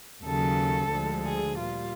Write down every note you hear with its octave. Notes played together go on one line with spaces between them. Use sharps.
D#2 C#3 F#3 A4
D2 D3 F3 G#3
G#4
A#2 G3 F4